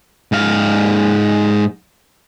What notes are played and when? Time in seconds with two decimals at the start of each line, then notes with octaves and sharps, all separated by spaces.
0.32 G#2 F5